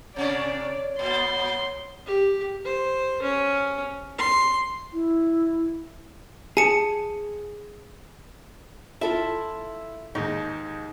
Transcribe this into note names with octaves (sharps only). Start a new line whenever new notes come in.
C3 C#4 D4 C#5 D5
A#2 B3 C6
G4
C5
C#4
C6
E4
G#4 G#5 A5 C#7
E4 F4 A4 E5
D#2 G#2 D#4